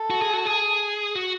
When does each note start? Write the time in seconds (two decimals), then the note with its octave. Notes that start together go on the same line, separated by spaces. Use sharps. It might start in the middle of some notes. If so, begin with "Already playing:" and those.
Already playing: A4
0.10 F#4
0.22 G#4
0.34 F#4
0.46 G#4
1.15 F#4